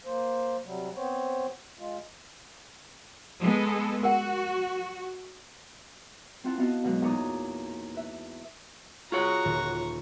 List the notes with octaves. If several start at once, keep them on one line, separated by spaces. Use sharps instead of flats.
A#3 C5
C3 F#3 G3
B3 C4 C5 C#5
G#3 F4
G#3 B3 A4
F#4 A#4 F#5
C4 E4 F4 F#5 A5
B3 E4 F#4 D#5 F5 A5
F#2 B2 F#3 G#3 B4
E2 A#2 D#4 C#5 D6 D#6
B4 E5
F4 F#4 G#4 C#5 A#5 C#6
D#1